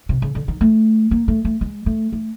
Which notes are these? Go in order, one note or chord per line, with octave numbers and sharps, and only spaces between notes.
C3
C#3
D3
D#3
A3
A#3
A3
A3
G#3
A3
A3